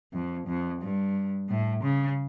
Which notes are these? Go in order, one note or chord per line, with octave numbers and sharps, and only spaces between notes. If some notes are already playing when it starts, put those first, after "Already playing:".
F2
F2
G2
A2
C#3